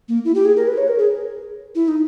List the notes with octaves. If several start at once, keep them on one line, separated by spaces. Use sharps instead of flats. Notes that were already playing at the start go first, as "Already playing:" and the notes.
A#3
E4
G4
G#4
A#4
B4
C#5
A#4
G#4
E4
D#4